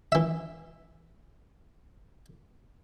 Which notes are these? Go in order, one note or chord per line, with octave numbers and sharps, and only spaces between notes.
E3 E5